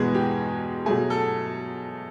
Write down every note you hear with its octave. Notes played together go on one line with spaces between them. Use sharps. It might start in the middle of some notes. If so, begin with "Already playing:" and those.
Already playing: E2 B2 G#3 B3 G#4
G4
B2 F#3 A3 G#4
A4